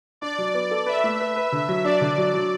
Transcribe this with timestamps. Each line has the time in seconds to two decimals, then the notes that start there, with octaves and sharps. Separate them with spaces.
0.21 D4 D5
0.38 F#3
0.54 B3
0.71 A4
0.86 B4 E5
1.04 A3
1.20 B4
1.36 B4
1.52 D3
1.69 F#3
1.85 D4 D5
2.01 D3
2.18 F#3
2.34 F#3